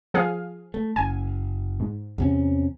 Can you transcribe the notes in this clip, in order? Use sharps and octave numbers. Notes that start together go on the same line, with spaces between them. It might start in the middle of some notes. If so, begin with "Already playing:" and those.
F3 G#4 F5
A3
F#1 G#5
G#2
E2 C3 C#4